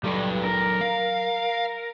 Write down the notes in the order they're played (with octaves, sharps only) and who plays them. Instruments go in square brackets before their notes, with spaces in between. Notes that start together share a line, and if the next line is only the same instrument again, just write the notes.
[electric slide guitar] G2 G3 [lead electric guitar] F#3 A4
[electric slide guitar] A#4
[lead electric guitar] F5